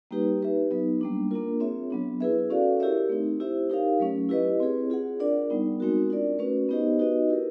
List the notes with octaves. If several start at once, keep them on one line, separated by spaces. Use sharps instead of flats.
G3 A#3 D#4 G4 B4
D#4 G4 B4 E5
F#3 B3 D#4
G3 A#3 D4
A#3 D4 F4 A#4
C4 F4 G#4 C#5 E5
F#3 B3 D4
E4 G#4 B4 E5
C#4 F#4 A4 D5 F5
E4 G4 A#4 C#5 E5
A3 C4 D#4
E4 G4 C5 E5
D#4 G4 A#4 C#5 F5
F#3 A3 C#4
E4 G4 B4 D#5
C4 E4 G#4 C#5
F4 G#4 C#5 F#5
D4 F4 A#4 D5 F#5
G3 B3 D#4
G#3 C4 D#4 F#4 A#4
D4 F4 A#4 D5
A3 C#4 F#4 B4
B3 D#4 G4 C5 D#5
D#4 F#4 B4 D#5
E4 G4 A#4